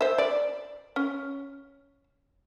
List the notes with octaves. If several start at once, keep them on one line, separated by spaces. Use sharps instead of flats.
C5 E5
D5
C#4